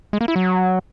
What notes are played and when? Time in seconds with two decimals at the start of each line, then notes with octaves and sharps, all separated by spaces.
0.13 G#3
0.21 A#3
0.28 E4
0.36 F#3